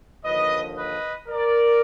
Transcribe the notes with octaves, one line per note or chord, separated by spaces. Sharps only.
D#2 D3 F3 B4 D#5
B4 D#5
A#4 D5